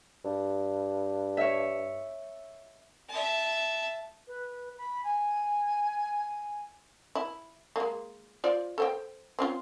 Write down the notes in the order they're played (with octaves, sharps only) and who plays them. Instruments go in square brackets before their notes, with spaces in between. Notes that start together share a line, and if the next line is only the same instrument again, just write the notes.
[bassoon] G2
[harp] C#5 E5
[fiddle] E5 A5
[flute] B4
B5
G#5
[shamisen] E4
G#3 A#3
F4 C5 D5
A4 C5 G5
C4 C#4 F4